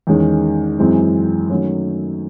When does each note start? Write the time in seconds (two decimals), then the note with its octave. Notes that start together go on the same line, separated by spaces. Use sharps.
0.07 E2 D#3 G#3 C#4
0.79 F#2 E3 G#3 C4
1.50 D#3 F#3 A3 C#4